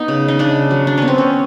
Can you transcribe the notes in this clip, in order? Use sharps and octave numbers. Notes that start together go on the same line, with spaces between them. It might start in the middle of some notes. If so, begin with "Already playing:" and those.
Already playing: B3 D#4
C#3
D#4
C#3 D4
F#3
D4
B3 C#4
C4
C#4